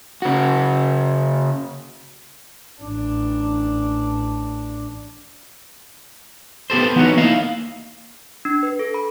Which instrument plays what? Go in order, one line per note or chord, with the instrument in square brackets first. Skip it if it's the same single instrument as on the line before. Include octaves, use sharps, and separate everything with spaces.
[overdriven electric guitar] C#3 F#4
[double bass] A1 D4
[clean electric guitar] B3 G4 A4 C5
E3 B3 D#4 F#4 B4 C#5
A#3 D#4 E4 D#5 F5
[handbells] D4
B4
A4
B5